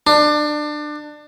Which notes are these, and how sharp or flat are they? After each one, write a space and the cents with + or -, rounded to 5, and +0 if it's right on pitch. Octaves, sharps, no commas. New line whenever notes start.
D4 +25